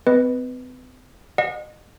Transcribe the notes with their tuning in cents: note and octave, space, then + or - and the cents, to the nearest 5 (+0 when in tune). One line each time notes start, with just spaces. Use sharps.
C4 -45 B4 +0 D#5 -5
D#5 -30 F#5 -35